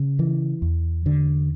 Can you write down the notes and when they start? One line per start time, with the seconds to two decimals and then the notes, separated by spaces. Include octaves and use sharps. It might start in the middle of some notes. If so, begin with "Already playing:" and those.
Already playing: C#3
0.19 E3
0.62 E2
1.06 D3